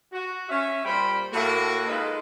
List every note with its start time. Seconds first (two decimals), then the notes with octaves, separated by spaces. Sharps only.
0.13 F#4
0.50 C#4 E5
0.85 A#2 G3 C5 G5 B5
1.33 A2 A#3 F#4
1.87 G#3 D#4 F4 A4 B4